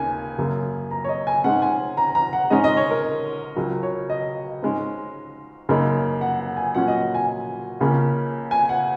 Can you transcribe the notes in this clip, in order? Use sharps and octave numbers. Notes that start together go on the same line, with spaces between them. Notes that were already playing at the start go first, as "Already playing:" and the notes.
Already playing: D#2 C#3 A#3 G#5
F#2 C#3 A#3
A#5
C#5
D#5
G#5
G#2 G#3 C#4 F#5
G#5
A#5
A#5
F#5
G#2 G#3 C#4 D#5
D#5
C#5
A#4
C#2 C#3 F#3 A#4
C#5
D#5
G#2 G#3 C#4
F#2 C#3 A#3 D#4
F#5
F#5
G#5
A#2 F#3 C#4 F#5
D#5
F#5
G#5
C#2 C#3 A#3 C#4
G#5
F#5